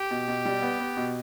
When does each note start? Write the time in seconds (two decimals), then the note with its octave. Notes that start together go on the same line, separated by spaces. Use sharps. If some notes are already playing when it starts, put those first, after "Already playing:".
Already playing: G4
0.11 B2
0.28 B2
0.45 G3
0.62 B3
0.80 B3
0.97 B2